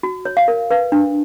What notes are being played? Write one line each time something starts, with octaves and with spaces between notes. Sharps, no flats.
F#4
C#5
F5
A#4
B4 F5
D4